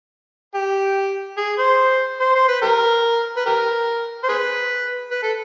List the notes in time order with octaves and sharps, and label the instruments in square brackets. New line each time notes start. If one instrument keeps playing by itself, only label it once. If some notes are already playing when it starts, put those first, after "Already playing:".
[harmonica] G4
G#4
C5
C5
C5
B4
G4 A#4
B4
G4 A#4
C5
G#4 B4
B4
A4